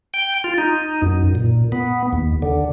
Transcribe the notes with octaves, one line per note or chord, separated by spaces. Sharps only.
G5
F4
D#4
F#2
A#2
B3
D#2
D3